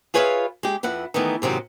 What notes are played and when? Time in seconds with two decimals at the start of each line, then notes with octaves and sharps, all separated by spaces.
0.14 F4 G#4 B4 C#5 E5 F5
0.63 G#3 G4
0.83 F2 E4 B4 F#5
1.14 D#3 E3 A3 B3 D#4
1.42 G#2 C3 D#3 F#3